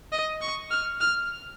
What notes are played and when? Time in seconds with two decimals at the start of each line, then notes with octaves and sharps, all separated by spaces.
0.12 D#5
0.42 C#6
0.71 F6
1.01 F6